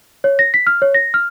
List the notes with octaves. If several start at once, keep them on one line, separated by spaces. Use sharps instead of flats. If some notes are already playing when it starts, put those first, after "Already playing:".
C#5
A#6
B6
F6
C#5
A#6
F6